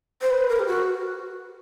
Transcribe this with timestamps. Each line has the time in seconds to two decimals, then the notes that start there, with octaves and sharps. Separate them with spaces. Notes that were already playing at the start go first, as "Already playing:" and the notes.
0.22 C5
0.31 B4
0.49 A#4
0.59 G4
0.67 F#4